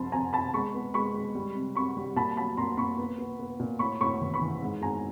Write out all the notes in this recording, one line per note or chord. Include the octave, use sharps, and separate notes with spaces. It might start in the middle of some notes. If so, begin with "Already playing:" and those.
Already playing: F2 C3 A5 B5 C6
F2 G#5 A#5
C3 A5 B5
G#3 B5 C#6
B3
G#3 B5 C#6
G#3
G3
C3
C3 B5 C#6
G3
A#2 A5 B5
F#3 A5 B5
A#2 A#5 C6
A#2 B5 C#6
B3
B3
B3
A#2
A2 B5 C#6
A2 B5 C#6
E3
B5 C#6
E3
G#2
G#2 G#5 A#5